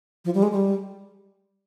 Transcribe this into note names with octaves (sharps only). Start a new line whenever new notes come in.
F3
G3
G#3
G3